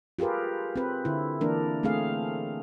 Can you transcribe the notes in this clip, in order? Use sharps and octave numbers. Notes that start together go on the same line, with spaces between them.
F4 G4 G#4 A#4 B4
C4 B4
D3 E4
E3 A#3 D4 A#4
A3 C4 G#4 F5